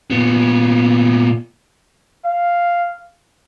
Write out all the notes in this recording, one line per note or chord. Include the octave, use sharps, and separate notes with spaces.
A#2 B3
F5